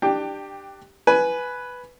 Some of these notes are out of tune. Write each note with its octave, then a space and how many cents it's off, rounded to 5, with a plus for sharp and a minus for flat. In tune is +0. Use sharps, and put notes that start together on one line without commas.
D4 +25 G4 +0 G5 +15
B4 +0 G#5 +15